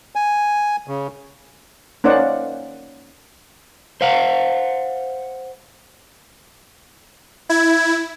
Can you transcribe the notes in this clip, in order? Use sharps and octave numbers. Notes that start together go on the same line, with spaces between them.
G#5
C#3
A#3 C#4 D#4 C5 D5 F#5
C5 F5 F#5
E4 G#6